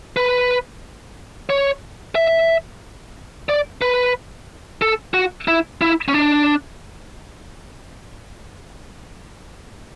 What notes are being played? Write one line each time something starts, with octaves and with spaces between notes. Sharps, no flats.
B4
C#5
E5
D5
B4
A4
F#4
E4
E4
C#4
D4